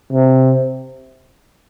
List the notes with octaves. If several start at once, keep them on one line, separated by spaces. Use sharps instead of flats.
C3